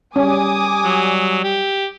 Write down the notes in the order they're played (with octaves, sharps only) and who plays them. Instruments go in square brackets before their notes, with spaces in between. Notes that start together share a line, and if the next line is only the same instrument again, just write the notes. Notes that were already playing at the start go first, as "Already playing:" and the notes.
[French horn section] G3 [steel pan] C#4 [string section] G#5 D6 D#6
[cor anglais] F#3
G4